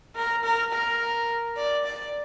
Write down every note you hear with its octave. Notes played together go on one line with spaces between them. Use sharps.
A#4
A#4
A#4
D5
D5